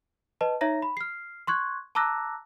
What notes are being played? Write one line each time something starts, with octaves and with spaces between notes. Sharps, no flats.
B4 D#5 A5
D#4 C#5 E5 A#5 A#6
B5
F6 C7
C6 C#6 F#6 G#6
A5 A#5 D6 E6 F#6 A#6